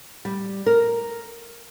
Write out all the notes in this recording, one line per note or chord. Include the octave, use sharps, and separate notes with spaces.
G3
A#4